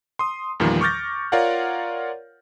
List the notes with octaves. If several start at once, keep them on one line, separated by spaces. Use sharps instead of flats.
C6 D#6
E2 A#2 D#3 F3 G3
C#6 D6 F6 G6 A6 A#6
F4 A#4 C#5 D5 F5 F#5